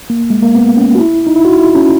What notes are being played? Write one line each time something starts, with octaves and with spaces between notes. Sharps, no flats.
A#3
G#3
A#3
B3
C#4
F#4
E4
D#4
E4
F#4
E4
C#4